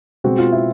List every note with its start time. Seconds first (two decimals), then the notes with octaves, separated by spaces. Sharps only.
0.24 B2 G#3 C4 F#4
0.38 F4
0.52 E4